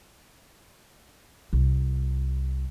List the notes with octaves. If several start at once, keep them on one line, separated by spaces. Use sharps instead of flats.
C2